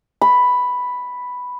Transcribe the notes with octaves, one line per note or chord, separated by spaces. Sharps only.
B5